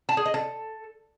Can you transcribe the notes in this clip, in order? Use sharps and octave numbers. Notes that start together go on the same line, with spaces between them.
A5
G#4
D#5
A4